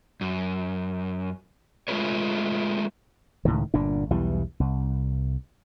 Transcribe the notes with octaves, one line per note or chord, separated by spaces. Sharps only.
F#2
G#3 A3 F4 F#4 B4 C#5
C#2 A2 D#3
G1 A#2 D4
B1 E2 E3 G3
C2